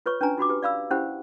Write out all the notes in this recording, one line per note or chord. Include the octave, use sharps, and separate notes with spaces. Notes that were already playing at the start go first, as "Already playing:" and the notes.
F4 B4 C#5 C#6
C#4 D4 B4 G#5 A#5
F4 F#4 B5 D6
G4 B4
D5 F5 B5 E6
C#4 E4 G4 C5 F#5 B5